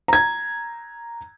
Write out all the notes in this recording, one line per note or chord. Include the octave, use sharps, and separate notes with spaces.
A#5 G#6